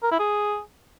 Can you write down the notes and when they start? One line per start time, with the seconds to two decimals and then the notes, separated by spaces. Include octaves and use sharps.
0.03 A#4
0.11 E4
0.20 G#4